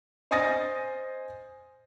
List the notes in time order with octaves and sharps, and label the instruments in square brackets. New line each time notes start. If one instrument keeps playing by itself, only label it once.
[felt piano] C5 D#5 G#5 D#6 A6 A#6